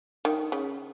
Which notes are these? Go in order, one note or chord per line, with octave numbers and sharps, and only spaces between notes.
D#3
C#3